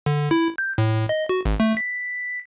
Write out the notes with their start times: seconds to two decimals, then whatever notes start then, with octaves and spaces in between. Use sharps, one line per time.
0.06 D3
0.31 E4
0.58 G6
0.78 A2
1.09 D#5
1.29 F#4
1.45 G#1
1.60 A3
1.77 B6